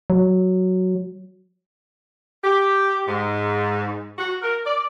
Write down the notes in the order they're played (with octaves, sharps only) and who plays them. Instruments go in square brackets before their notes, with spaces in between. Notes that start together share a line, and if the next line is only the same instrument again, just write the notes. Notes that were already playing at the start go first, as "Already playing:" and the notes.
[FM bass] F#3
[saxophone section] G4
G#2
F#4
A#4
D5